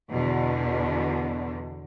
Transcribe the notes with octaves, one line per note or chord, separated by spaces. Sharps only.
E2 B2 D3